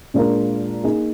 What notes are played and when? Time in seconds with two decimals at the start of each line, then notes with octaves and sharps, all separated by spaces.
0.14 A#2 G#3 D4 F4 A#4
0.84 A#3 D#4 G#4